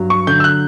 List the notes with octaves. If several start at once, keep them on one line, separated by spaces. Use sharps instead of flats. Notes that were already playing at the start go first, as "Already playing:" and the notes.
Already playing: G2 F#3
C#6
D3 G6
E6
F#6